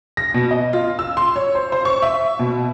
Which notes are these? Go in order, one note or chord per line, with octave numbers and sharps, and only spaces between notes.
A#6
B2
D#5
F4
E6
C6
C#5
C5
C5
C#6
E5
B2